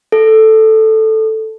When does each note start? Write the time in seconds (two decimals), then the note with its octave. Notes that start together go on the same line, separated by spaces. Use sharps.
0.12 A4